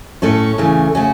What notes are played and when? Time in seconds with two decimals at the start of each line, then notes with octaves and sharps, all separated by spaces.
0.22 A2 A3 C#4 A4 C#5
0.58 E2 C#3 E3 A3
0.95 C#3 A3 C#4 F#4